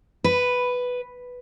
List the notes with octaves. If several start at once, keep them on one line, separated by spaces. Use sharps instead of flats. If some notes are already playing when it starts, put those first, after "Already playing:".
B4